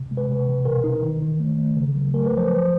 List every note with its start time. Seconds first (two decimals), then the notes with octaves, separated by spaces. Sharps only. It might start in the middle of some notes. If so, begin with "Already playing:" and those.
Already playing: C3
0.11 G#3
0.17 B4
0.29 C3
0.48 E3
0.65 B2 A#4
0.84 D#4
1.03 D#3
1.22 D#3
1.39 A3
1.58 A3
1.76 C#3
1.95 F#3
2.14 A3 A#4
2.26 B4
2.33 F3 C5
2.51 F3